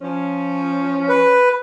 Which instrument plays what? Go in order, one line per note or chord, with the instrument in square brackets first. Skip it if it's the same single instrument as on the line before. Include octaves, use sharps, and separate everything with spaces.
[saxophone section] F3 C#4
[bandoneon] B4